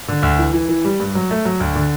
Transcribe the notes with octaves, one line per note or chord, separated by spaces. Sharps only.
D3
D2
E3
E3
E3
G3
G2
F#3
A3
F#3
D2
D3